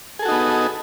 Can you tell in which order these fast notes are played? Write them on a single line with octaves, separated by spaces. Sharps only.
G#4 A4 F#4 D#4 B3